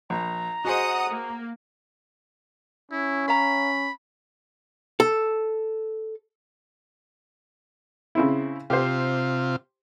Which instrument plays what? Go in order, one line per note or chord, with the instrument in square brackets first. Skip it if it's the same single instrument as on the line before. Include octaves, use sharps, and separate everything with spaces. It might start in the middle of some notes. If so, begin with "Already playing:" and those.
[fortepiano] A#1 [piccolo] A#5
[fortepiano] F#4 G#4 C5 [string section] D#5 F#5 D#6
[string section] A#3
[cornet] C#4 [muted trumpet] E4
[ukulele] C#5 F5 A#5 [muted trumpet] B5
[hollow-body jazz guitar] A4
[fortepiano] C#3 C4 E4
[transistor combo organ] C3 F4 [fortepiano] G4 C5